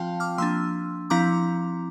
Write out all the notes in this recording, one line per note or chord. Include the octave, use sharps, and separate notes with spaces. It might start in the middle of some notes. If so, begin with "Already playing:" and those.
Already playing: F3 C4 F4 F5 G5 A5
D6 F6
F3 A#3 D4 C6 E6
F3 C4 E4 A#5 D6